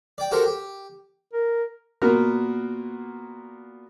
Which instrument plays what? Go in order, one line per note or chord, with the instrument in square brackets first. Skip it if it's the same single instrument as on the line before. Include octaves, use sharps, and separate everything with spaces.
[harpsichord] D5 G5
F#4 G4 A4 A#4 C5
G4
[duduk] A#4
[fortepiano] A#2 A#3 B3 F#4 A#4 F6